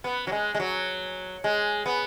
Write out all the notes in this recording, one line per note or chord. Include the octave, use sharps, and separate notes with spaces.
B3
F#3
G#3
G#3
F#3
G#3
B3